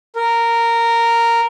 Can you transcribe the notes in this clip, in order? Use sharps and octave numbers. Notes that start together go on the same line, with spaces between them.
A#4